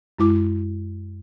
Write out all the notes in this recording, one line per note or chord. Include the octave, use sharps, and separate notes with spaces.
F#2 G#3 E4 D6